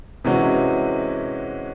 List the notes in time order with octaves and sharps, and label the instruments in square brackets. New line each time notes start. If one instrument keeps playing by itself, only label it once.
[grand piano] C3 E3 G#3 C#4 F#4